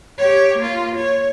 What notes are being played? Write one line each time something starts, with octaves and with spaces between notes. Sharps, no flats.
G4 C#5
A#3 F4
C#5